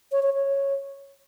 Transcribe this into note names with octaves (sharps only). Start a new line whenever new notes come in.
C#5
C#5
C#5